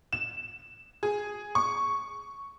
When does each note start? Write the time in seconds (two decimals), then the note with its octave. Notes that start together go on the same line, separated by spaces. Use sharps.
0.13 E7
1.03 G#4
1.55 C#6